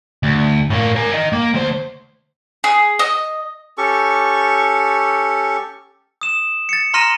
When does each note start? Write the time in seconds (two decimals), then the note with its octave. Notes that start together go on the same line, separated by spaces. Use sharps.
0.23 D2
0.70 A2 A#3
0.96 A#4 G#5
1.13 A#4 D#5
1.33 A#3
1.54 D2 C5
2.64 G#4
2.99 D#5
3.78 C#4 G4 A4 C#6
6.21 D#6 E7
6.69 A6 C#7
6.94 A#5 C6 F6 A#6 D#7 E7